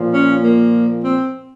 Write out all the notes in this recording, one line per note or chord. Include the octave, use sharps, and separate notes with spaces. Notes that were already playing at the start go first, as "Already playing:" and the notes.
Already playing: A#2 F3
C#4
A#3
C4